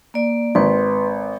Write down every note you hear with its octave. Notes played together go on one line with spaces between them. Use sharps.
A#3 D5
G#1 B4 C6